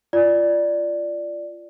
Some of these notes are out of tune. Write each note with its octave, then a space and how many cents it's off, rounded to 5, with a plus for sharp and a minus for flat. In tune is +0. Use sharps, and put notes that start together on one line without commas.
F4 -25 D5 +0